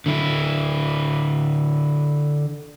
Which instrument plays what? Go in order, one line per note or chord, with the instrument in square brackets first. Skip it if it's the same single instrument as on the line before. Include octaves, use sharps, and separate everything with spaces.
[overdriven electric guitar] D3 E4